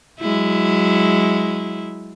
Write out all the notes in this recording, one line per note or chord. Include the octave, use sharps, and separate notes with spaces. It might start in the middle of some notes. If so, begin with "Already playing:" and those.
F#3 G#3 E4